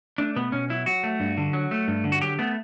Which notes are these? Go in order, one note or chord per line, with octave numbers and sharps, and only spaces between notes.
A3 D4
B2 B3
B2 C#4
F#3 E4
F#3 F#4
A3
G2
D3
F#3
A3
G2
D3
F#4
F#3 G4
A3 B3